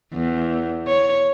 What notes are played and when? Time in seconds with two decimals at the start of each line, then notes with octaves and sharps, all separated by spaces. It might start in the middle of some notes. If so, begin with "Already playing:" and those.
0.14 E2
0.87 C#5